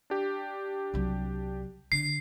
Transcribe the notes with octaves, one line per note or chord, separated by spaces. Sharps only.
D4 G4
C2 F#3
D3 C7